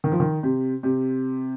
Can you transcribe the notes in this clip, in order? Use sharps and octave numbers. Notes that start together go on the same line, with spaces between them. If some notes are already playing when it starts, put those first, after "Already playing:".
D#3
F3
D#3
C3
C3